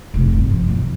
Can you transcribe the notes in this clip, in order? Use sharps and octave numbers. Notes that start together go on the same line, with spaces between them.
F1 C2
G2
F3
B1 E2
C#3